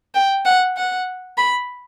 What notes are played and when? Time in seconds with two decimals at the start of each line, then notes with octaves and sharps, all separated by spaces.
0.14 G5
0.45 F#5
0.77 F#5
1.38 B5